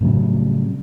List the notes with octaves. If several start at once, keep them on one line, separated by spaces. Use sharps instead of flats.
A2 C#3 F#3 G3